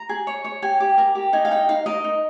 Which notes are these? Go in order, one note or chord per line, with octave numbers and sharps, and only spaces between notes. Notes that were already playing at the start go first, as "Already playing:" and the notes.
Already playing: A#5
G#4
C#5
C#5
G4 G#5
G4
A#4
G4
D#4 G#5
F5
D#4 G5
D#4 F5
A#4 D#5
D#4